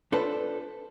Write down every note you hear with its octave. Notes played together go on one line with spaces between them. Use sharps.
D4 F4 A4 B4 C5